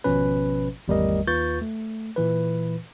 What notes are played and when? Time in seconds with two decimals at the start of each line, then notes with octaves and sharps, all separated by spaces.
0.04 G#1 B2 F3 C#4 B4
0.88 G#1 E2 G3 A3 A#4 D#5
1.27 D#2 F4 B4 C#6 G6 A6
1.62 A3
2.16 A#2 E3 B4